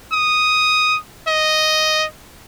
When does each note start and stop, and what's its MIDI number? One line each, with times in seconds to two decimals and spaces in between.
0.12 0.98 87
1.28 2.06 75